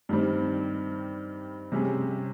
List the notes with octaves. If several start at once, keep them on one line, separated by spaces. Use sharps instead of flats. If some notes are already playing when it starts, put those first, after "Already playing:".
G2 D#3 G3 C4
C3 G3 C#4 G#4